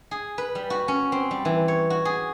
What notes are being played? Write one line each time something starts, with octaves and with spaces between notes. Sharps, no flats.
G#4
B4
G3
F#4
C#4
C4
G3
E3
C#5
F#4
G#4